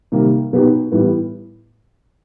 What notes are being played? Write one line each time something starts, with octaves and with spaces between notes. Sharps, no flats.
C3 D#3 G3 A#3
B2 F#3 B3 D#4 G4
A2 E3 G3 B3